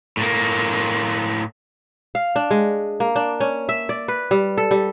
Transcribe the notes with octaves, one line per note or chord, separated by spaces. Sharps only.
A2 A#3
F5
D4
G#3
A#3
D4
C#4
E5
D5
B4
G3
A4
G3